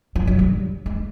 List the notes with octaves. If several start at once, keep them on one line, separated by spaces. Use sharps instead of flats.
F3
F#3
G3
G#3